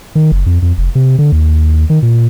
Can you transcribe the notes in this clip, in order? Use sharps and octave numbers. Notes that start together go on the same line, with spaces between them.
D#3
F#1
F2
F2
F1
C3
D3
D#2
D#3
A#2